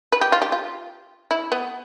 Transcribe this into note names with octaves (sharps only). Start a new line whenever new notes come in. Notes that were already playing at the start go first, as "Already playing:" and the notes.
B4
G4
F4
G4
F4
E4
B3